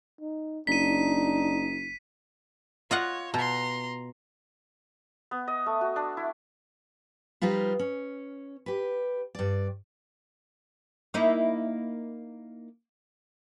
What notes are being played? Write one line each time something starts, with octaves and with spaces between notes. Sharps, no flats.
D#4
F#1 D4 D#4 B6 D#7
F4 C#5 D#5 F#5
B2 A#5 C6
B3
D#5
A3
F#4
D4
E4
F3 G3 D#4 F4 B4
C#4
G4 B4
G2 D5
A#3 D#4 E4